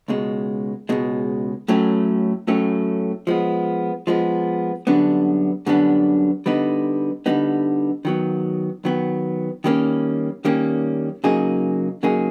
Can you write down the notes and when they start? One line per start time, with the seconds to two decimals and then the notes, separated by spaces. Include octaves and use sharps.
0.08 C#2 B2 G#3
0.89 C#2 B2 G#3
1.68 A2 F#3 A3 C#4
2.47 A2 F#3 A3 C#4
3.27 F3 G#3 B3
4.07 F3 G#3 B3
4.87 F#2 D3 G3 B3 D4
5.66 F#2 D3 G3 B3 D4
6.46 D3 G3 B3 D#4
7.26 D3 G3 B3 D#4
8.05 D#3 F#3 B3
8.85 D#3 F#3 B3
9.64 D#3 G3 A#3 C#4
10.45 D#3 G3 A#3 C#4
11.24 C#3 F#3 A#3 D#4 G#4
12.03 C#3 F#3 A#3 D#4 G#4